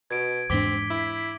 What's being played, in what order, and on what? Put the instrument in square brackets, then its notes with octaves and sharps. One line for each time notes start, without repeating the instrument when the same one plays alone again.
[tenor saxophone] B2 [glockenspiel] G#6 D7
[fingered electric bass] E2 G#2 D4 [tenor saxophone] C4 [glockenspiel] D6 B6 G7
[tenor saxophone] E4